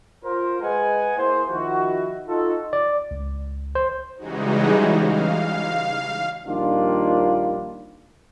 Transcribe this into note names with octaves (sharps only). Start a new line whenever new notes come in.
F4 A#4 C5
G#3 B4 D#5 F#5 G#5
A#3 E4 G#4 C5
D#3 F3 E4 F#4
D#4 F4 F#4 A4
D5
C#2
C5
C#3 E3 G3 G#3 D#4 F#4
F5
A#1 D#3 G3 A#3 D4 F4